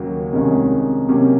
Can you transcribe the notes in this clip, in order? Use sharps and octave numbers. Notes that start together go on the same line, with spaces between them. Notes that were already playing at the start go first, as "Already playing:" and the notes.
Already playing: D#2 C#3 F#3 A#3 C#4
C2 C3 D#3 G#3 C#4
C3 F#3 A#3 C#4